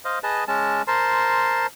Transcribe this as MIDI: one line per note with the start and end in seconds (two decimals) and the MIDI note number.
0.05 0.19 72
0.05 0.19 75
0.05 0.19 77
0.23 0.44 68
0.23 0.44 71
0.23 0.44 75
0.23 0.44 81
0.48 0.82 56
0.48 0.82 61
0.48 0.82 81
0.87 1.67 70
0.87 1.67 72
0.87 1.67 81
0.87 1.67 84